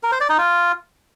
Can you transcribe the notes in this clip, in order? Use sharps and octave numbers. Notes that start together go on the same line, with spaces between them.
A#4
C5
D5
D#4
F4